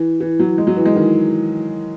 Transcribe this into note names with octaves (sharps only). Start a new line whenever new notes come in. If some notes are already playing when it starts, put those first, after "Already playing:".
Already playing: E3
E3
F#3
G#3
F#3
E3
G#3
D#3